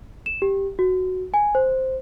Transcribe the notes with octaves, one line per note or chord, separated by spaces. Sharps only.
E7
G4
F#4
G#5
C5